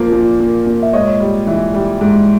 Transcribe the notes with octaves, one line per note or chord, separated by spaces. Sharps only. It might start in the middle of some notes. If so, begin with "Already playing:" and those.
Already playing: A#2 F3 A#3
A#2
A#3
A#2
E5
G#2 C#5 D#5
G3
E3
G3
G#2